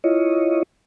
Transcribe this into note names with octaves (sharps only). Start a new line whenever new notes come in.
E4 F4 C#5 D#5